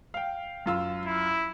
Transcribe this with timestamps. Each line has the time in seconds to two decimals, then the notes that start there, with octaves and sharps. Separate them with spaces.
0.14 F5 G5
0.66 F#2 F4 E6
1.06 E4